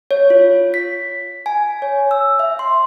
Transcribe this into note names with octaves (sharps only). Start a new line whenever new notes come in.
C#5
F4
B6
G#5
C#5
E6
E5
C6